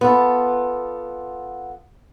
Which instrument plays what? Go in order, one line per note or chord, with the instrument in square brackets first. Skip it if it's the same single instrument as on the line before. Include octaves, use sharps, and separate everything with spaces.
[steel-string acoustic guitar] B3 F4 A4